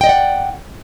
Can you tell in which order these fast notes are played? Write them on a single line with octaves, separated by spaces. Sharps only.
G5 D#5 D5 F#5